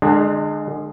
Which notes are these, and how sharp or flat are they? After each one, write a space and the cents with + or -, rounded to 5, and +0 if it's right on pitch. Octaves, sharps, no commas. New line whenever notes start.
D3 +40 G#3 +0 D4 +35